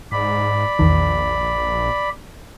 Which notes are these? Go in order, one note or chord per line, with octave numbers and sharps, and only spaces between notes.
G#2 D5 B5
A#1 E2 D#3